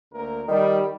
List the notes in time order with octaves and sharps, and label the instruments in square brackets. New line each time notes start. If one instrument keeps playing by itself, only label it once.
[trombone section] D2 A#3 A#4
[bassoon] D#3 [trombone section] G3